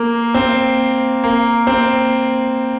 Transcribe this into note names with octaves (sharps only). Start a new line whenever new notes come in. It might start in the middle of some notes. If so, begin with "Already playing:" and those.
Already playing: A#3
C4
A#3
C4